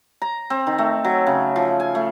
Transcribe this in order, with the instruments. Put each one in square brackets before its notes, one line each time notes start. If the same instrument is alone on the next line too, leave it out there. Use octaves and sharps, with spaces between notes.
[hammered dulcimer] A#5
C4
D#3
A3
F#3
C#3
F3
G#5
A3